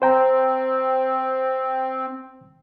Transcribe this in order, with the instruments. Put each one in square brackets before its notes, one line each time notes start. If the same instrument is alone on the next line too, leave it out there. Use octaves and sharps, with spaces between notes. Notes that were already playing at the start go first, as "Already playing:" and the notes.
[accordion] C4 [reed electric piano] C5 G5 A#5